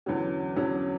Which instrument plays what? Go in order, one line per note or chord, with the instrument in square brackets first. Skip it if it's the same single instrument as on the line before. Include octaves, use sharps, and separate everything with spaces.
[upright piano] E2 D3 F#3 C#4
E2 D3 F#3 C#4